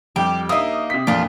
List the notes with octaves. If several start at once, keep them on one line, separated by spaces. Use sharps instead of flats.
F2 G3 G4 G5
A#3 D#4 E5 D#6
C3 B6
A1 F2 A#2 D4 F4